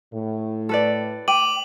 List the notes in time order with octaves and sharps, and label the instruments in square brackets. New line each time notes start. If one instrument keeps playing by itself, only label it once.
[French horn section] A2
[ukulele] A4 B4 D5
[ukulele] G5 [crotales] D6 D#7 F#7